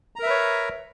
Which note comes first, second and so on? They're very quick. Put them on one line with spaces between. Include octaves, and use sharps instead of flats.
A#5 A#4 E5 B4 C#5